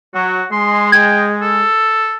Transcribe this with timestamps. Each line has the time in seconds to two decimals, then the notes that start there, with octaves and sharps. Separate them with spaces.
0.14 F#3 F#4
0.52 G#3 C6
0.92 G5 G#6
1.42 A4